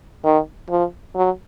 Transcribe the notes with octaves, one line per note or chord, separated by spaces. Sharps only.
D#3
F3
F#3